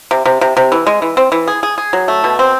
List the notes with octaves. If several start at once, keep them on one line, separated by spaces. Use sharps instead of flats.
C3
C3
C3
C3
E3
G#3
E3
C4
E3
G#4
G#4
G#4
F#3
A3
B2
C4